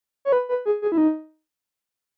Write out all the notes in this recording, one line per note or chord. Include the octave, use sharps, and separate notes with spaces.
C#5
B4
B4
G#4
G#4
E4
D#4